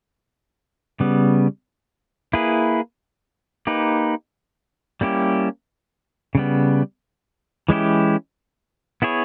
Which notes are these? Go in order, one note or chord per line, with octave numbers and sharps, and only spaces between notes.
C#3 G3 B3
A#3 E4 G#4 B4
A#3 D#4 G4 B4
G3 A#3 C#4 E4 G4
C#3 G3 B3
E3 G#3 C#4 E4 G4
B3 E4 G#4 C#5